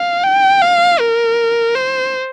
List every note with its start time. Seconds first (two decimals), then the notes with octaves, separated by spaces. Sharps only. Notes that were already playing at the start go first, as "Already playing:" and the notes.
Already playing: F5
0.24 G5
0.61 F5
0.99 A#4
1.76 C5